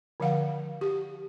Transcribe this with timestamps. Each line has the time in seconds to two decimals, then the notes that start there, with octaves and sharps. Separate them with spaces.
0.20 D3 F3 F5 F#5
0.81 G4